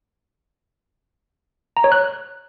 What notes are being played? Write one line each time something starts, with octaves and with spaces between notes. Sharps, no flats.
A#5
C#5
F#6